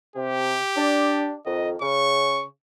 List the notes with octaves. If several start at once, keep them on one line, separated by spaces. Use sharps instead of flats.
C3 G4
D4
F2 D#3 D#5
C#3 C#6